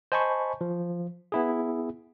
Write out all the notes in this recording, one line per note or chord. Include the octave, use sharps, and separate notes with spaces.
C5 D#5 G#5 A5 B5 C#6
F3
B3 E4 G#4